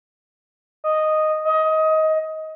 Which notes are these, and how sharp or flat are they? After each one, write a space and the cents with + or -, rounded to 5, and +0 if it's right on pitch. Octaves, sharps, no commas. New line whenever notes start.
D#5 -5
D#5 +20